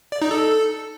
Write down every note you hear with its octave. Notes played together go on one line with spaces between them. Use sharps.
D5
D#4
A4